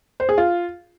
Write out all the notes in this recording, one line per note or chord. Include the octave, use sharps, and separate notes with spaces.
C5
G#4
F4